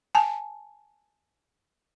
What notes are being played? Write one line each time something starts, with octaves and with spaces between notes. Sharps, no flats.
G#5 A5